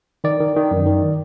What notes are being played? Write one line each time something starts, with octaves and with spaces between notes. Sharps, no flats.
D#3 D5
D#3
D#3
F#2
D#3